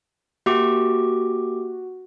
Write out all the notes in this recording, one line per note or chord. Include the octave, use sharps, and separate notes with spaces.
A#3 F#4 G4 D6